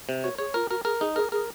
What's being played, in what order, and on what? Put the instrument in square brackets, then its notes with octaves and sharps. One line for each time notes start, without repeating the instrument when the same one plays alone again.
[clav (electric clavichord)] C3
[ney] F#4 [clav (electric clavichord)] C#5
[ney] G#4 [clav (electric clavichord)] C#5
[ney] F4 [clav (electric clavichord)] A#4
[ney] F#4 [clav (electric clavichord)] A#4
[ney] G#4 [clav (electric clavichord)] A#4
[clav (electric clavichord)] D#4 [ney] G#4
[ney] G#4 [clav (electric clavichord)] A#4
[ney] G#4 [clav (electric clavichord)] A#4